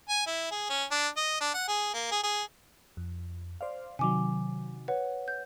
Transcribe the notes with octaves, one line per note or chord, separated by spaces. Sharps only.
G#5
E4
G#4
C#4
D4
D#5
D4
F#5
G#4
A#3
G#4
G#4
F2
C5 D5 F5
C3 D#3 F#3 G#5 D6
B4 C#5 F#5
G6